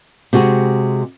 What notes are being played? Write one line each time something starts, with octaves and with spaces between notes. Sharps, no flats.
C3 G#3 F#4 G#4